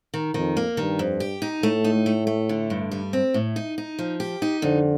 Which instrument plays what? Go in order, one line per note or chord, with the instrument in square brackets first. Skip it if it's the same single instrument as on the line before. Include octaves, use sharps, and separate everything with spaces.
[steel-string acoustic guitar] D#3
[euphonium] F2 [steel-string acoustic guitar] D#3
[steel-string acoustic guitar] A#3
[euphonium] G2 [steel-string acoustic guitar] D#3
[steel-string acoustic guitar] F2
G4
D#4
[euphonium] A2 [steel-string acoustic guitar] A3
[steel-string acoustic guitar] D#4
A3
A3
D3
G2
G3
C4
A2
D#4
D#4
F3
G4
D#4
[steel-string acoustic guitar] F2 [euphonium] D3